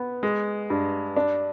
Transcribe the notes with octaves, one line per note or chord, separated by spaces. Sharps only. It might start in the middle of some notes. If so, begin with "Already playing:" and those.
Already playing: B3
G#3
G2
D4